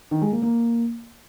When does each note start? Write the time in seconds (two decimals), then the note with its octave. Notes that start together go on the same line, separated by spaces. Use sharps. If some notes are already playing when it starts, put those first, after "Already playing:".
0.11 D#3
0.22 G#3
0.32 A#3
0.42 A#3